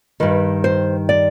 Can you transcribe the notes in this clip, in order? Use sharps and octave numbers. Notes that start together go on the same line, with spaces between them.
G2 D#3 B4
C5
D5